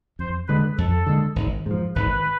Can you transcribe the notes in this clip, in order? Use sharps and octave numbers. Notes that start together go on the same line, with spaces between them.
F2 C5
D3 G#3 B4
F2 A4
D3 G#3
G#1
G#2 F3
G#1 B4